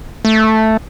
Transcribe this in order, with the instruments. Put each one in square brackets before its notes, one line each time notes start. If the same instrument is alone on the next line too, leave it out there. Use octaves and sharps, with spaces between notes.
[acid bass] A3